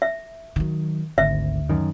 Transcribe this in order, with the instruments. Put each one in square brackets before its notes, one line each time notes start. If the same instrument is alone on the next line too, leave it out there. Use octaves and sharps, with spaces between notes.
[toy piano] E5
[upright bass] D#3 F#3
[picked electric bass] G#1 [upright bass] D2 [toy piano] E5
[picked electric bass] F#2 D#3